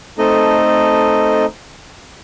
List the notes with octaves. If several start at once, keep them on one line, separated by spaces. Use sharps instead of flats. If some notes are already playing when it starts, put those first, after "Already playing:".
A3 C4 D#4 A4 D#5